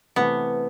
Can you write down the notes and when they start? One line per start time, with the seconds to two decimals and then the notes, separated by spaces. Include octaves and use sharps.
0.16 C3 E3 A3 B3